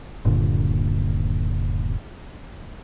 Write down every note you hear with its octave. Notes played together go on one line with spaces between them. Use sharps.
D#1 G2 A#2 D3